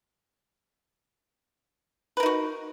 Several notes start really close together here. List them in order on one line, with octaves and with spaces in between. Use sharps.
B4 A#4 D#4 F#4